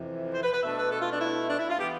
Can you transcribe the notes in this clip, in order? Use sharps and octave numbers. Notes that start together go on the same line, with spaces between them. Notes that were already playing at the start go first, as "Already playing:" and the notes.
Already playing: F2 C3 E3
C5
B4
B4
B2 A3 D4 E5
B4
A4
F4
D4
E4
D4
E4
F4
E3 B3 G4